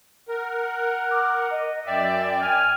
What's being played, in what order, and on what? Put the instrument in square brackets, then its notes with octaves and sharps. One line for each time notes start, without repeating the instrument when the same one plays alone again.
[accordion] A#4 [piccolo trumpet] F#5
[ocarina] D6
D#5
[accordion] F#2 D5 [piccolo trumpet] E5 [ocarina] G5
[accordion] G#5 [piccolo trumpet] F6